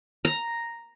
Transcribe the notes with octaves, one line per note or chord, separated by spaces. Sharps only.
A#5